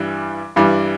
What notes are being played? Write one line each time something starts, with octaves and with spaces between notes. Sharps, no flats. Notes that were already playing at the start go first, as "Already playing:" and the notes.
Already playing: G2 E3 G3
G2 E3 G3